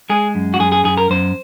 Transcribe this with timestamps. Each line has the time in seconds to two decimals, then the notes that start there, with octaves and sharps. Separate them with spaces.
0.10 G#3 G#4
0.35 F#2
0.54 F#4
0.60 F#2 G#4
0.72 G#4
0.85 F#2 G#4
0.97 A#4
1.10 F#2 C5